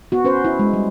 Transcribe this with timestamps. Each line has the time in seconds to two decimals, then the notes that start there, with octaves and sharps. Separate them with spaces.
0.12 B3 F#4
0.24 C#4 B4 C5
0.45 E4
0.59 G#3
0.73 G3